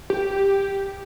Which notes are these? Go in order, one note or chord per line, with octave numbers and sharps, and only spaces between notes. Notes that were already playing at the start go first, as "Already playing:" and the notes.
G4